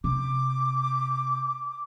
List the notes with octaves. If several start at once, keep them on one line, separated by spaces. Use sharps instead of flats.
C3 D6